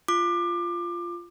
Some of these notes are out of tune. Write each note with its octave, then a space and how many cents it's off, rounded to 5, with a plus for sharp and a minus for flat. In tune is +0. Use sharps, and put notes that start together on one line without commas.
F4 -10 D6 +25